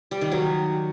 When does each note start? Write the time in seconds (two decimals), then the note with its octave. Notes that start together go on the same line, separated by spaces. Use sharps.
0.11 G3
0.21 D#3
0.32 F#3